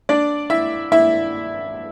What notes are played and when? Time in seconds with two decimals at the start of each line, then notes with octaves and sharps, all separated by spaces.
0.09 D4 D5
0.50 E4 E5
0.92 E4 E5